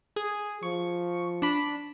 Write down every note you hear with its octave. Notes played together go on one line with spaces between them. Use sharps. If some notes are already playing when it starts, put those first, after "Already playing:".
G#4
F3 C#6
D4 B5